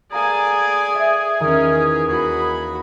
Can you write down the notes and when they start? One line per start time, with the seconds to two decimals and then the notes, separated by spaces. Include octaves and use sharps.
0.12 G#4 A4 D5 F5 G#5 A#5
0.95 E5
1.40 E2 D#3 C#4 A#4
2.08 D#2 F#4 G#4 B5